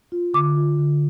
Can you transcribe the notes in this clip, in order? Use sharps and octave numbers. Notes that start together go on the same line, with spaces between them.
F4
D3 D6
F4
D3